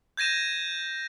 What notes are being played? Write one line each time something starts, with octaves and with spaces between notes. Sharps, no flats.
G6 G#6 A#6 D#7 E7